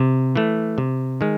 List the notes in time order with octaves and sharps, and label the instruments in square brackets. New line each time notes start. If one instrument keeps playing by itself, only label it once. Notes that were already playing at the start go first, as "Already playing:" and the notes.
Already playing: [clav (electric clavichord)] C3
E3 A3
C3
D#3 G#3